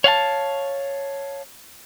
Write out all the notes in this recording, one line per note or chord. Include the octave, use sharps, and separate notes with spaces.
C#5 F5 F#5 A5